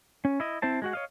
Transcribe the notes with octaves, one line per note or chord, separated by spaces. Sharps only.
C#4
E4 D#5
C4 E4 C5 A5
G#3 F#4 F#5
C#5 D#5 F5